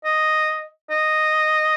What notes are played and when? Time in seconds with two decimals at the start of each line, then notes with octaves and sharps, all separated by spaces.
0.05 D#5
0.91 D#5